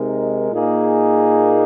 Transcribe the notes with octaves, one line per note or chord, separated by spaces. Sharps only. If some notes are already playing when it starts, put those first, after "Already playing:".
Already playing: C3 G#3 D#4 A#4
A#2 A#3 D#4 G#4